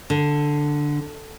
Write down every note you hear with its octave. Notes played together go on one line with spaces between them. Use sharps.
D3